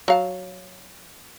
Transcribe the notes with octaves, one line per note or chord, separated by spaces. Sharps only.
F#3 F5 A5